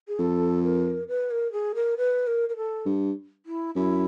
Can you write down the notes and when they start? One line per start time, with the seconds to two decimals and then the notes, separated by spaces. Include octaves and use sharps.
0.08 G#4
0.19 F2 A4
0.64 A#4
1.08 B4
1.31 A#4
1.52 G#4
1.75 A#4
1.97 B4
2.27 A#4
2.49 A#4
2.57 A4
2.86 G2
3.46 E4
3.75 F#2 E4